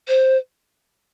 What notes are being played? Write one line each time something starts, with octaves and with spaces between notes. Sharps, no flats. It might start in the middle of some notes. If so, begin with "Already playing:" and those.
C5